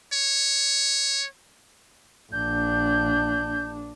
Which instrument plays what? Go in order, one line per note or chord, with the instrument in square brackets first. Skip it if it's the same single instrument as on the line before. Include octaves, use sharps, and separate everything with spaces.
[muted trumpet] C#5
[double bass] A#1 D4 [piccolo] G6